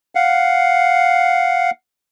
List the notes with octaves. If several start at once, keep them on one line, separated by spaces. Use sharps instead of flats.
F5 F#5